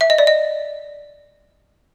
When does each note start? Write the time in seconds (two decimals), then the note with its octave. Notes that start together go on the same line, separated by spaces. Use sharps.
0.01 E5
0.10 D#5
0.18 D5
0.27 D#5